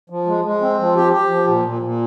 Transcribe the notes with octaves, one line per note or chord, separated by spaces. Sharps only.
F3
G#3
G#3
C4
F3
G4
G4
F3
A#2
A#2
A#2